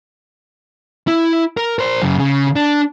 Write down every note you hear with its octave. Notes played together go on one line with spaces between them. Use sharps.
E4
A#4
A#4 C5
F#2 C#3
C#3
D4